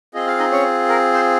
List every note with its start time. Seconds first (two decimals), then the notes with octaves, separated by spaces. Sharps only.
0.14 C4 F4 G#4 D#5
0.27 F5
0.39 D#4 D#5
0.52 C#4 C#5
0.89 A#4
1.13 C5